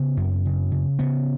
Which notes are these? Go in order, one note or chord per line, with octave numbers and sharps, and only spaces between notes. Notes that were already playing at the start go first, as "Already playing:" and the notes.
Already playing: C#3 B3
F#2
C#3
C#3
C#3 B3